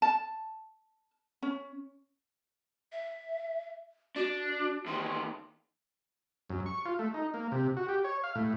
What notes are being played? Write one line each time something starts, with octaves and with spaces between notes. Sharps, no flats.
A5
C#4
E5
D4 F#4
E2 D#3 C6
F#2
C#6
F4
A3
D#4
A#3
C3
F#4
G4
C#5
F5
A2